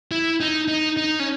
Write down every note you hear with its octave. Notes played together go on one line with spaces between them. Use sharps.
E4
D#4
D#4
D#4
C#4